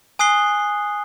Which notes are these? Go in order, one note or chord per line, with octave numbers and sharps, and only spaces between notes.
G#5 D#6 F#6 C7 G7